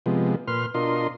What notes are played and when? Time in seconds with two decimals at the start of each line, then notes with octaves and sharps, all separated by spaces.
0.06 C3 F3 G#3 B3
0.48 A#2 B4 C6 F6
0.74 B2 D4 F4 A#4 D#5 C6